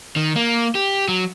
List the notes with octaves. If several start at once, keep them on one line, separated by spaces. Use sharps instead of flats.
D#3
A#3
G4
F#3